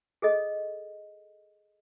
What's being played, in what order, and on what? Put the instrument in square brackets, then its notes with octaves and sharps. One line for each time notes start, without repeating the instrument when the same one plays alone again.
[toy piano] G#4 A4 D#5